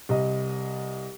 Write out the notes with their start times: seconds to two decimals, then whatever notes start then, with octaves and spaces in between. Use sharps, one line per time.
0.09 C2 D#5